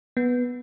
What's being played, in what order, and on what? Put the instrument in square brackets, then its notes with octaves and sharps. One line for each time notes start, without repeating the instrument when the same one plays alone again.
[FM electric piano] B3